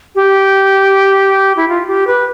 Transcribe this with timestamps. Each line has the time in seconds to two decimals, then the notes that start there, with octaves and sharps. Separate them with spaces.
0.15 G4
1.57 E4
1.68 F4
1.87 G4
2.07 B4